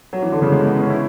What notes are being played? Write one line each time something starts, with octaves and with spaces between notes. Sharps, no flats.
F#3
E3
D3
C#3
G#3
B3
C#4
C#4
E4